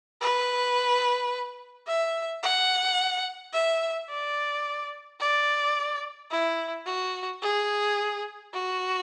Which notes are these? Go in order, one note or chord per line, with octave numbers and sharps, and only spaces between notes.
B4
E5
F#5
E5
D5
D5
E4
F#4
G#4
F#4